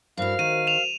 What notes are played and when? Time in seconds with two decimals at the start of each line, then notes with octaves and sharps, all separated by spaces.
0.17 G2 E4 F#4 A#4 C5 F5
0.39 D#3 D#7
0.67 E7 F7